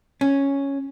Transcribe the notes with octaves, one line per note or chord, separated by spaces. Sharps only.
C#4